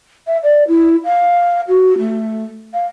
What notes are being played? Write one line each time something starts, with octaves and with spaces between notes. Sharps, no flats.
E5
D5
E4
F5
F#4
A3
F5